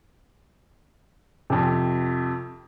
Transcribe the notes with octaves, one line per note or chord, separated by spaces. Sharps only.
F2 C3